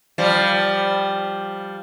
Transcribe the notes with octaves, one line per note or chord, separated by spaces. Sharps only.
F3 G3